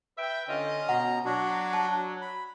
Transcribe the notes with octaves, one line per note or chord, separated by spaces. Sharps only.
B4 E5 G5
D3 C#4 F4 D#5
B2 F#5 A#5
F#3 D4 F#4
A5
B5